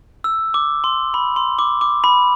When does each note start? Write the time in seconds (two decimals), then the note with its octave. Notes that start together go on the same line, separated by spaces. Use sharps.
0.24 E6
0.54 D6
0.84 C6
1.14 B5
1.36 C6
1.59 D6
1.81 D6
2.04 B5